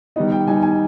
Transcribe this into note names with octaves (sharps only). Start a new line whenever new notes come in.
D#3 G3 B3 D#4 D#5
G5
D#3 G3 B3 D#4 G#5
G#5